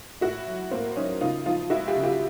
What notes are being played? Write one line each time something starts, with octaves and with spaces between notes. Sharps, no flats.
A2 E4 F#4
F#3
A2 A#3 C4
F#3 C#4 D#4
C#3 D#4 F4
F3 D#4 F4
G#3 E4 F#4
F4 G4
C#3
F4 G4